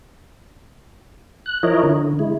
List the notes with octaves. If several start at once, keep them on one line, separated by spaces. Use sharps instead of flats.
F#6
F3 E4 A#4 C#5 D#5
D3
G#3 E4